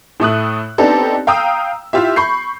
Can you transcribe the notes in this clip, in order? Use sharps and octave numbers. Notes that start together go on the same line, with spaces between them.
A2 A3 D#6 F#6
B3 C4 D4 D#4 G4 A4
F5 G5 A#5 D#6 E6
E4 F4 G4 E5
B5 C#6 G6 C7